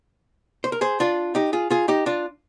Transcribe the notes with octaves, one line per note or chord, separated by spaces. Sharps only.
C5
A#4
G#4 C5
D4 F4
D#4 G4
F4 G#4
F4 G#4
D#4 G4
D4 F4